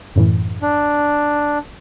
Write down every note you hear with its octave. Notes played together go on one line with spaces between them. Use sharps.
F#2 A2 E3
D4